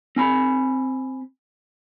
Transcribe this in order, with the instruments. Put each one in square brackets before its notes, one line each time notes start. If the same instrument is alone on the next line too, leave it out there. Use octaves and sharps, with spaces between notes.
[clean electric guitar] C4 G#5 B5